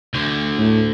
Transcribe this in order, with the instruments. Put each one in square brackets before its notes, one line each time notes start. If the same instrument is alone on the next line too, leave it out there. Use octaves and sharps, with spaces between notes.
[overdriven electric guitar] D2 D3
[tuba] A2